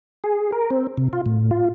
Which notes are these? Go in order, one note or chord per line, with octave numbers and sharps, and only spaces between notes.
G#4
A#4
C4
C3
F4
A2
F4